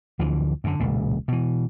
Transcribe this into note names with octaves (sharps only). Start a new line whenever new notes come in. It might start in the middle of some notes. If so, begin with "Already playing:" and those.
D2 D3 E3 F3
F#2 D3
E1 C#2 A#2
B2 E3